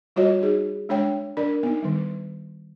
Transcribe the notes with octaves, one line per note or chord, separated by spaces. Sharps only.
G3 F4 F#4 C#5 D#5
D#4 G#4
G#3 D4 C#5 G5
D4 A#4 D5
B3 D#4
D#3 G3